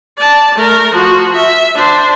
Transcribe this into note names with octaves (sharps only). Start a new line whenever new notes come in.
D5 A5
A3 A#4
F3 F#4
E5
D4 C5